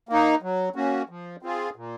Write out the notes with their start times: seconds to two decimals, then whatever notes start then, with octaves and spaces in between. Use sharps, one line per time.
0.09 A#3 D#4
0.42 F#3
0.76 A#3 C#4 F#4
1.09 F3
1.43 C4 F4 G#4
1.76 A#2